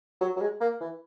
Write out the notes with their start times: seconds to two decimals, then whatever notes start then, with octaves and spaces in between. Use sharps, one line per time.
0.21 F#3
0.37 F#3
0.41 G#3
0.61 A#3
0.81 E3